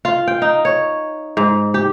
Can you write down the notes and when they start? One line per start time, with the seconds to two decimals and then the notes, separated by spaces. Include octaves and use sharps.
0.05 F4
0.27 G5
0.42 D#4
0.65 C#5
1.37 G#2
1.74 G4